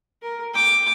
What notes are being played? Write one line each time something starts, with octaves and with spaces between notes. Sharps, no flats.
A#4
G5 D6